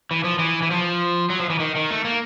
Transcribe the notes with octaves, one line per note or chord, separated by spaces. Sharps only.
E3
F3
E3
E3
F3
F#3
F3
E3
D#3
D#3
A3
A#3